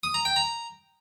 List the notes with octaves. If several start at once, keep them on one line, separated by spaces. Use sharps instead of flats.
D#6
A#5
G5
A#5